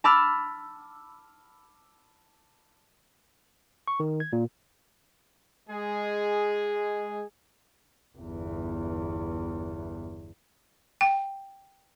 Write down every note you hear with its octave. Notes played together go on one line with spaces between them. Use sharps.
A5 B5 D6 E6 F6 A6
C#6
D#3
G#6
A#2
G#3 G#4
G1 E2
G5